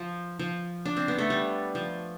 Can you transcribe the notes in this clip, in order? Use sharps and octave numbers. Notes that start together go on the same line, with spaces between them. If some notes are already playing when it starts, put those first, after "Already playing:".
Already playing: F3
F3
D4
C4
B3
A3
G3
F3